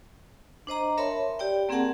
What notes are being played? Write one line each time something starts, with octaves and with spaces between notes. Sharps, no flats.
D4 C5 D#5 A#5
A#4 C#5 E5 A5 B5 C6
G4 D5 G5
A#3 C4 G#4 A#4 F#5 A5